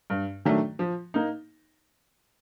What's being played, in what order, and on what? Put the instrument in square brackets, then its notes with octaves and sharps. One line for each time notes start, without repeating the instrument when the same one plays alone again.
[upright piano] G2
D#3 F#3 A3 D4
F3
A#3 D#4